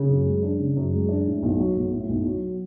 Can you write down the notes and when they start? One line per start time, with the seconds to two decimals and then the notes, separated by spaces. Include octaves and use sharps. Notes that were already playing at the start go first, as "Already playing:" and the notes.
Already playing: C#3
0.09 F#2
0.26 G#3
0.43 D4
0.60 C#3
0.77 F#2
0.93 G#3
1.09 D4
1.26 A2
1.42 B1
1.59 F#3
1.76 B1
1.92 A2
2.09 B1
2.26 F#3